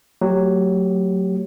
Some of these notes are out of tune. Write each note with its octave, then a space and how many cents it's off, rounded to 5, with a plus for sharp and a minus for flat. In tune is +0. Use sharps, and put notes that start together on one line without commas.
F#3 +0 A3 +25 G4 -10